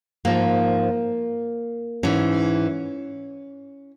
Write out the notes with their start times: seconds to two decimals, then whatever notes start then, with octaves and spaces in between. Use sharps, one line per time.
0.25 G#2 F3 A#3
2.03 G#2 E3 C#4